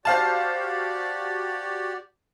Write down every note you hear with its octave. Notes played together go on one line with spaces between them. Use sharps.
F#4 G4 C5 D5 F5 A5